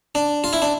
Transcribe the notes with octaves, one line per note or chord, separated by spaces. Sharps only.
D4
F4
E4
D4